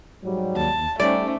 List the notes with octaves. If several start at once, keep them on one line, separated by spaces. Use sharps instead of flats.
G#2 F#3 G3
D#2 A5
G3 A3 C#4 D#4 C5 D5